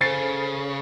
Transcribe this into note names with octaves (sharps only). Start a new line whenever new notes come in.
C#3 A4 C5 A6 C7